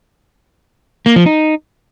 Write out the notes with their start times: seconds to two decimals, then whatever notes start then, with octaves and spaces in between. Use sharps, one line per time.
1.06 A#3
1.16 F3
1.26 D#4